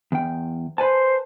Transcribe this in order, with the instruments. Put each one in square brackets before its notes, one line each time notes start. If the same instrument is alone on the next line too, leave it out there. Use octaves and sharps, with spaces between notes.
[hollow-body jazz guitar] E2 G5
[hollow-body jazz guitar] B4 G#5 A5 [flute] C5